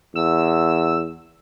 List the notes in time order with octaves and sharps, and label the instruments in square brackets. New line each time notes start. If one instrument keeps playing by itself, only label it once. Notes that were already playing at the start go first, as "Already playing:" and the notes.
[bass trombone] E2 [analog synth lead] E6